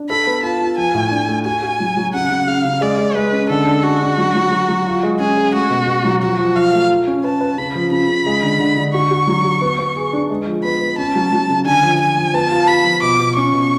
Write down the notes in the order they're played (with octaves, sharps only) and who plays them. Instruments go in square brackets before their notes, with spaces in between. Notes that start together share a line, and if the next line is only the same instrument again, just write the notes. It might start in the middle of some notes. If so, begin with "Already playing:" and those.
Already playing: [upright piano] D4
[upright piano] A4 [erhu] B5
[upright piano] B3
[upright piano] F4 [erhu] A5
[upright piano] F4
[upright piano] F3 [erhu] G#5
[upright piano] A2
D4
A3
[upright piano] F#4 [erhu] G#5
[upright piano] F#4
F#3
F#3
[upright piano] C#3 [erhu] F#5
[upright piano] C#3
[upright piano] C#3 [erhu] F5
[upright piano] C#3
[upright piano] G#3 [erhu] D5
[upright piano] G#3
[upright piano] G#3 [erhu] B4
[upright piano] C#4
[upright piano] D3 [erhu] A4
[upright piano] D4
[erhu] F#4 [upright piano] G#4
[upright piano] D4
F#3
F#3
F#3
F#3
F4
G#3
[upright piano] C#4 [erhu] G#4
[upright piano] G#3
[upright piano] A3 [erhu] F#4
[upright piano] B2
B2
F#3
[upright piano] F3 [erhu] F#4
[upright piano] F3
[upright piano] F3 [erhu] F5
[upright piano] A3
F4
C#4
[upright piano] B4 [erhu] A5
[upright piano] B4
[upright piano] C#3 [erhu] B5
[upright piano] F3
[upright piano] C#3 [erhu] B5
[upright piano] C#3
G#3
D3
D3
D3
[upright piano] F#4 [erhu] C#6
[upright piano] F#4
F#3
F#4
B3
B3
G#4
D4
G#3
F3
[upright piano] B3 [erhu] B5
[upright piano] B3
[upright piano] C#4 [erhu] A5
[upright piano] F#3
F#3
C#3
[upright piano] D3 [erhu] G#5
[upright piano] F3
[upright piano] F3 [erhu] G#5
[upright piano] F3
[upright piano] B3 [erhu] A5
[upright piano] F4
[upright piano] F4 [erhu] B5
[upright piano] F3
[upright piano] B2 [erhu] D6
[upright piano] B2
[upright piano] C#4 [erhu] C#6
[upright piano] B2